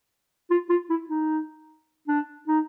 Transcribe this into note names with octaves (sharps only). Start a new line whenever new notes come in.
F4
F4
E4
D#4
D4
D#4